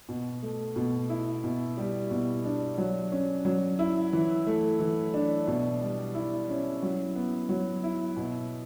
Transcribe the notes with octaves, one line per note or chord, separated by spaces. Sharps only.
B2
A3
B2
E4
B2
G3
B2
D4
F#3
C#4
F#3
E4
E3
A3
E3
D4
B2
G3
E4
C#4
F#3
B3
F#3
E4
B2